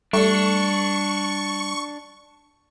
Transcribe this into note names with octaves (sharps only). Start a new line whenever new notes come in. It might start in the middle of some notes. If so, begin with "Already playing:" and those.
G3 A3 D4 C#6